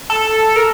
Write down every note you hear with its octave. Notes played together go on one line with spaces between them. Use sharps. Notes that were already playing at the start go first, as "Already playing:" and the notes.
A4
A#4